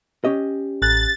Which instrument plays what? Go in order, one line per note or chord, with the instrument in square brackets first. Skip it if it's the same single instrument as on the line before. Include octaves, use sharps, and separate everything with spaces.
[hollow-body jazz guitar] C#4 G4 D#5
[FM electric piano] A1 F#6 [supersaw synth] A6